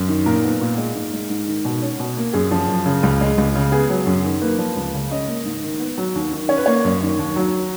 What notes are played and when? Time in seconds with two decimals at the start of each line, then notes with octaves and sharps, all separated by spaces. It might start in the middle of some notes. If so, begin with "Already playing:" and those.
Already playing: F#2
0.08 D#3
0.26 A#2 A#4
0.44 B3
0.61 A#2
0.78 G#3
0.95 G#2
1.13 G#3
1.30 G#2
1.47 D#3
1.65 B2
1.82 C#4
2.00 B2
2.17 A#3
2.33 F#2 G#4
2.51 F3
2.68 F#2
2.86 C#3
3.03 C#2
3.21 G#3
3.38 C#2
3.55 C#3
3.72 B3 G#4
3.90 F#3
4.07 F#2
4.25 D#3
4.42 A#3 B4
4.58 F3
4.77 C#2
4.94 C#3
5.11 C#4 D#5
5.28 A#3
5.45 G#2
5.63 D#3
5.80 B3
5.98 F#3
6.15 D#2
6.32 D#3
6.49 C#4 C#5
6.58 B4
6.66 A#3 C#5
6.85 F#2
7.02 D#3
7.19 D#2
7.36 F#3